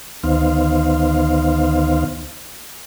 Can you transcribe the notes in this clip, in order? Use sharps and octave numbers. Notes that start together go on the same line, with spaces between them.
D2 D#3 B3 D#4 C5 F5